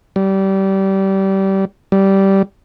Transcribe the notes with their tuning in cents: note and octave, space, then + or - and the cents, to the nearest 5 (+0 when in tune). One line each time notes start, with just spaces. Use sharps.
G3 -20
G3 -10